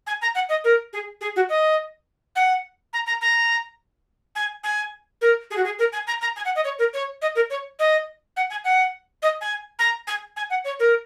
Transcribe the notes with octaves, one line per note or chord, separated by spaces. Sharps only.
G#5
A#5
F#5
D#5
A#4
G#4
G#4
F#4
D#5
F#5
A#5
A#5
A#5
G#5
G#5
A#4
G#4
F#4
G#4
A#4
G#5
A#5
A#5
G#5
F#5
D#5
C#5
A#4
C#5
D#5
A#4
C#5
D#5
F#5
G#5
F#5
D#5
G#5
A#5
G#5
G#5
F#5
C#5
A#4